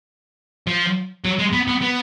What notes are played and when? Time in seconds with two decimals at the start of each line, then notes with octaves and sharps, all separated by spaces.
0.67 F3
1.25 F#3
1.39 G#3
1.53 B3
1.68 B3
1.82 B3